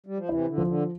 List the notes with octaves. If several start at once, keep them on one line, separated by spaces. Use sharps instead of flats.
G3
F3
C3 E3 E4
D3
C3 F3
D3